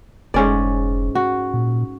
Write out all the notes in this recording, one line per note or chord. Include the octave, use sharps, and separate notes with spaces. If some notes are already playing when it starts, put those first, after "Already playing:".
F1 G#2 C#4 D5
F#4
A#2